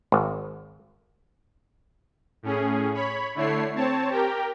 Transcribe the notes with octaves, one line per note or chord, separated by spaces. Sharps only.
G#1
A2 C#4 G#4
C#5 B5
D3 A3 E4 C#5 C7
C4 C#5 A5
G4 A#4 G5